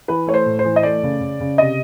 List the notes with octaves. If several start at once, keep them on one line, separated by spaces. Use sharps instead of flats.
E3 B4
A3 C#5
C5
A2
C5
E3
D#5
A3 D5
C#3
C#3
C#3
C3 D#5